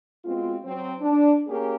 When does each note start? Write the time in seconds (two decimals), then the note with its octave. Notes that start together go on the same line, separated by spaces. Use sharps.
0.25 G#3 B3 C4 F4 F#4
0.64 F#3 C4
1.00 D4
1.47 A#3 C#4 G4 G#4 A#4